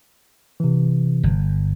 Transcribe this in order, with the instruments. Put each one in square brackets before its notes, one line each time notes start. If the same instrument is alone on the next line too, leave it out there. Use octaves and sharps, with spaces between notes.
[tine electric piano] C3 E3
[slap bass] G1